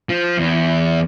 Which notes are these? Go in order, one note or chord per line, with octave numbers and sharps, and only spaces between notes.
F3
E2